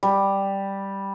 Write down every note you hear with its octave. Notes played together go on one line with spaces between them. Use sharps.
G3